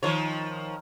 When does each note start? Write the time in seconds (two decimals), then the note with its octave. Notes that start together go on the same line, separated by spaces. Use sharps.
0.03 D#3 F3 C#5